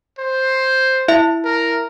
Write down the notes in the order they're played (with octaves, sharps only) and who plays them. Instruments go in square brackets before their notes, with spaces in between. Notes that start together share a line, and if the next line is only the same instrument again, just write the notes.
[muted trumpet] C5
[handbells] E4 E5
[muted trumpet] A#4